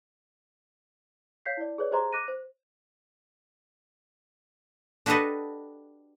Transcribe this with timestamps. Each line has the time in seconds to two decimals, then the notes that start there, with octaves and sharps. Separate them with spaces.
1.46 C#5 F5 G6 B6 C7
1.57 E4 D5
1.78 G#4 B4 C#5 D5
1.91 G4 G#4 C5 D#5 A#5 C6
2.12 D6 F#6 A#6 D#7
2.28 C5
5.06 D4 F#4 G4 A4 B4 D#5